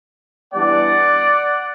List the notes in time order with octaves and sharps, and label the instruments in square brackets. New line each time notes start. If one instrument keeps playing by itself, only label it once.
[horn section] E3 G3 B3 D4 D5 F#5